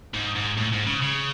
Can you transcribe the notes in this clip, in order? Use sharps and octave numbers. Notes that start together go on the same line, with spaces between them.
G#2
G#2
A2
G#2
C#3
C#3